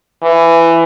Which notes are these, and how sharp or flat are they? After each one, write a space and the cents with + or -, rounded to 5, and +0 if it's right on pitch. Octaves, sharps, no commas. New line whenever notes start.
E3 +15